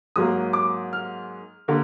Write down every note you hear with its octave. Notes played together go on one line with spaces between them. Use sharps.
G#2 F#3 A#3 D#6
D6
F6
D3 A#3